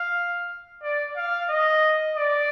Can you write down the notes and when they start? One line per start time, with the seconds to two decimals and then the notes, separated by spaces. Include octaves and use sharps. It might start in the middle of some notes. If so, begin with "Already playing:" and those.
Already playing: F5
0.83 D5
1.16 F5
1.50 D#5
2.16 D5